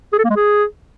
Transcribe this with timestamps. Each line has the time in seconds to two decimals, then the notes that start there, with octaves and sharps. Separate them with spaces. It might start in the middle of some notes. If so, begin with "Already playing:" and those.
0.13 G#4
0.18 A4
0.24 A#3
0.30 G#3
0.36 G#4